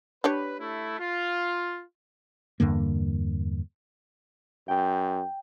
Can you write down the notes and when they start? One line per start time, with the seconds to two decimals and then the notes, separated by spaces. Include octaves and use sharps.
0.24 D4 G4 B4 C#5
0.60 A3 E4
0.99 F4
2.60 E2 G2 D3 A#3
4.68 F#2 G5